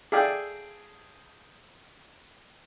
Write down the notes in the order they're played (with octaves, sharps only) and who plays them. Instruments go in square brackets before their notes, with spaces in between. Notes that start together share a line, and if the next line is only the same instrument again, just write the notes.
[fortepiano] G#4 A4 D5 E5 F5 G5